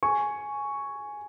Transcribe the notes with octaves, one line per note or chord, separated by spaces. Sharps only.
G#5 C#6